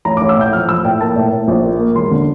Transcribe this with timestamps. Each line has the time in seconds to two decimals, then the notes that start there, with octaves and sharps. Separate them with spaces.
0.05 A1 A#5
0.17 A1 D6
0.29 E6
0.36 A2 G6
0.53 F3 F6
0.69 F3 E6
0.85 A2 G5
1.00 A#3 A5
1.16 A2
1.32 A2
1.48 A#1
1.64 A#3
1.79 A#3
1.95 E1 C6
2.11 D3